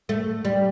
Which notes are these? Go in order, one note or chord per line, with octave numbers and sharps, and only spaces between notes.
A3
G3